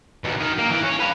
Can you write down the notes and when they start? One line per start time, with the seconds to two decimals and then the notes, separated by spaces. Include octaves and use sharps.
0.24 D#2 B2
0.40 D#3
0.59 A#3
0.71 E3
0.83 C#4
1.00 B4 F5